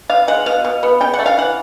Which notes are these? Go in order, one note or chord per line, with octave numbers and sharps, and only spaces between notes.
B3 F5
G#3 F#5
B2 F5
B2
B3
C#3 G5
F#5
A3
F5
E3 F#5